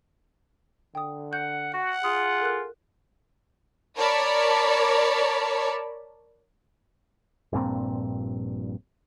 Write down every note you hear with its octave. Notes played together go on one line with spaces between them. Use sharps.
D3 G5 D#6
F#5 G6
F#4 F#5
F4 G#4 D#6
A4 A#4 F#6
A#4 C#5 D5 A5 B5
A#1 G2 A#2 C4